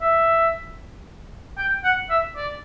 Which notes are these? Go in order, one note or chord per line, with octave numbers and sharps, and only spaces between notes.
E5
G5
F#5
E5
D5